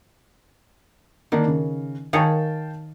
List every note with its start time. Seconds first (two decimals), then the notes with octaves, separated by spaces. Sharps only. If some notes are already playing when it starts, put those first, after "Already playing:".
1.32 D3 D#3 A#3 D4
1.48 C#3
2.13 D#3 G#4 C#5 F5 G5 A5